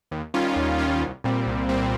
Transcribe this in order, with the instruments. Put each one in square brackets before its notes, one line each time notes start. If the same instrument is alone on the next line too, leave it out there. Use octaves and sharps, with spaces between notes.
[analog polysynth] D#2
D#3 G3 C#4 F4
D#2
D#3 G3 C#4 F4
C2
A#2 G3 C4
C2
A#2 G3 C4